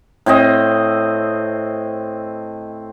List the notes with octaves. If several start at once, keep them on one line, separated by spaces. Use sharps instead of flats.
A2 C4 D#5